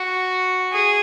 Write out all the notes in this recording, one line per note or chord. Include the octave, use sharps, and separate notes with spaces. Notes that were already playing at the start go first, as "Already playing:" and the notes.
Already playing: F#4
G#4